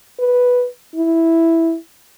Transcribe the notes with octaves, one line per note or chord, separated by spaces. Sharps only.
B4
E4